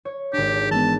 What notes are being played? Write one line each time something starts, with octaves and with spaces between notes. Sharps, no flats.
C#5
G#1 D4 G4
E3 G#3 B3 A5